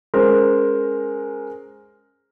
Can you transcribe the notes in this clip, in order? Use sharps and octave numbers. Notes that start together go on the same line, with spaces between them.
G#3 C#4 A#4 C5